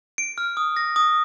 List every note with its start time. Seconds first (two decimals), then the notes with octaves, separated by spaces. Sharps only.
0.18 D7
0.38 F6
0.57 D#6
0.77 A#6
0.96 D#6